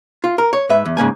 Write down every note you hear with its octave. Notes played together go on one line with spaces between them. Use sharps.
F4
A#4
C#5
G#2 B4 E5
E2
G#2 C#3 A#3 G#5